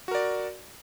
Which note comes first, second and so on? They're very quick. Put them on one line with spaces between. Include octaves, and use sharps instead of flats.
F#4 A#4 D5